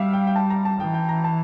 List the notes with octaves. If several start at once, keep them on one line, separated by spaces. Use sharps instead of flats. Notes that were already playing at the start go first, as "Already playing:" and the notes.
Already playing: G3 E5 F5
G5
G5
A5
A#5
A5
E3 G5
G5
A#5
A5